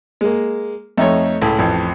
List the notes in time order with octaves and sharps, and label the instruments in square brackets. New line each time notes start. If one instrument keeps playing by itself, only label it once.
[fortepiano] G#3 A#3
[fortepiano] F2 C#5 [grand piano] A3 D#4
[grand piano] C#2 [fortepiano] A2
[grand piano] A1 F2